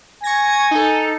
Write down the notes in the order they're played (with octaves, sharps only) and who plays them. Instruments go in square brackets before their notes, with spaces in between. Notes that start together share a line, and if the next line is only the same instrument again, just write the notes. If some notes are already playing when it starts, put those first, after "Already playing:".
[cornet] G#5 [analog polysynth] C#6 G#6 A#6
[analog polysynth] D#4 A4